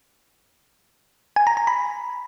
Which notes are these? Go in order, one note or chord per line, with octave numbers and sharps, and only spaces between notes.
G#5
A#5
A#5
B5